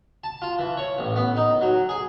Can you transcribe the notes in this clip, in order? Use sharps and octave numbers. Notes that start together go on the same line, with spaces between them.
A5
F4
E3
C#5
A1
B3
D#4
F#3
G#4